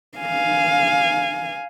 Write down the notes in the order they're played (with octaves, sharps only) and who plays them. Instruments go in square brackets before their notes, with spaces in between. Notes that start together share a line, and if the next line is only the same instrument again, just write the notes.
[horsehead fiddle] F5 G#5